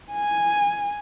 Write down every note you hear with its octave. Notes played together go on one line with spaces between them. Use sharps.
G#5